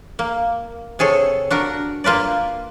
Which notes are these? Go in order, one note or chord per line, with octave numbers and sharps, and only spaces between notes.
A#3
C3 G#4 A4 C#5
D4 F#4 A#4
A#3 F4 B4 D5